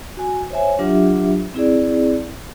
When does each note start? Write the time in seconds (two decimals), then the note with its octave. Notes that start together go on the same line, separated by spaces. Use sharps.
0.17 F#4 G#5
0.50 C5 C#5 E5 G#5
0.79 F#3 D4 F4 G4 E5
1.54 C4 E4 G#4 D5